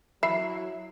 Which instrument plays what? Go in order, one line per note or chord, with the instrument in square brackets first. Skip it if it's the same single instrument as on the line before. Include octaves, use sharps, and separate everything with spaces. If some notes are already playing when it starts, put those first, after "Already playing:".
[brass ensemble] F#3 E4 [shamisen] E5 [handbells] B5 C7